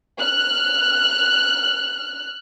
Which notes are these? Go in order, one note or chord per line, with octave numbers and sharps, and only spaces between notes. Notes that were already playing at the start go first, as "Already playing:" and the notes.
F6 F#6